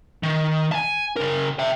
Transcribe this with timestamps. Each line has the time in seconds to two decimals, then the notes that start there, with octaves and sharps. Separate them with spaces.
0.23 D#3
0.72 G#5 A5
1.17 C#3 A#4
1.59 E5 G5